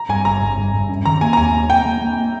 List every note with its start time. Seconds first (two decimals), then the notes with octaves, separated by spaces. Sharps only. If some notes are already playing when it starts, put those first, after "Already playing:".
Already playing: A#5
0.09 G2 G#5
0.25 G1 A#5
0.42 G1
0.57 G2
0.74 G2
0.89 C#4
1.05 D#3 A#5
1.21 A#3 G#5
1.33 A#5
1.37 D#2 G#5
1.54 A#3
1.70 A#3 G5
1.86 A#3
2.01 A#3